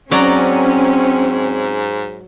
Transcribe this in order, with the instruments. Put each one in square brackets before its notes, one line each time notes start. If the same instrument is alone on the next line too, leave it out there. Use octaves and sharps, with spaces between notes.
[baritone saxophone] G#2 [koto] F#3 D5 A#5 [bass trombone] C4 [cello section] C#4